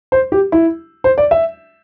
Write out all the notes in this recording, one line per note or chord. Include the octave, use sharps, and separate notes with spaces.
C5
G4
E4
C5
D5
E5